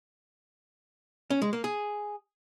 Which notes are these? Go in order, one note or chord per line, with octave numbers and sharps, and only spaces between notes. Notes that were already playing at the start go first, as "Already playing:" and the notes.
C#4
G#3
A#3
G#4